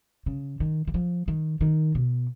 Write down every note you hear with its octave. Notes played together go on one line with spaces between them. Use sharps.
C#3
D#3
D#3
F3
D#3
D#3
B2